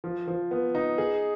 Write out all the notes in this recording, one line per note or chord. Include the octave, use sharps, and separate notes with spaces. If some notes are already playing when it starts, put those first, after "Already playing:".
F3
F3
B3
D#4
G#4